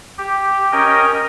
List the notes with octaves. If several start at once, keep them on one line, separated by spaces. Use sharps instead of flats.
G4
C#4 A#4 D#5 G5